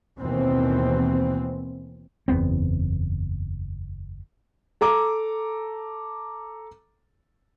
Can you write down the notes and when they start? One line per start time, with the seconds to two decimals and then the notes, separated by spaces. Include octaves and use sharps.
0.19 D#2 B2 E3 C4
2.28 F#1 E2 B3 C4
4.81 A4 A#5 D6